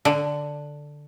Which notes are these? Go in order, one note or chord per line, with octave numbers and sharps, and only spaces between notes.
D3